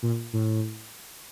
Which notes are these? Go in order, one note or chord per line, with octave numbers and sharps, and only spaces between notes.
A#2
A2